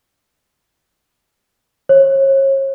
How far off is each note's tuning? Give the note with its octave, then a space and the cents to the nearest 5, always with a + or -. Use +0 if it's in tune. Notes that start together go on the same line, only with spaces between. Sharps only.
C#5 -40